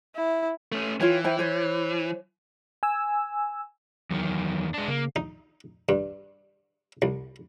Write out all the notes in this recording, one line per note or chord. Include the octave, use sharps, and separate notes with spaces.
E4
A3 C#4
E3 F4 C#5 G5
E4 C5 G5
C5 C#5
G#5 E6
E2 D#3 F#3
G#3 D4
C#3 A#3
D#4
G2
C2